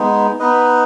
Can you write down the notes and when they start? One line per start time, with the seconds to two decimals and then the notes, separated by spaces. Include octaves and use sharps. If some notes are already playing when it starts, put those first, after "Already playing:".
Already playing: G#3 B3 D#4
0.39 B3 D#4 B4 D#5